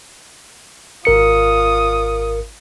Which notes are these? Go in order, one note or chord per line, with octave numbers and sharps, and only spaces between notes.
G#1 F4 A#4 D#6 C#7